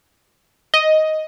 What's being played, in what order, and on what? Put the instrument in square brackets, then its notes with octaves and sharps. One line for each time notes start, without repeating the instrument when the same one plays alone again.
[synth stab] D#5